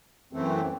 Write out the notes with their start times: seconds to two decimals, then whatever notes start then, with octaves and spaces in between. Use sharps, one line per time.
0.33 F#2 E3 A3 C4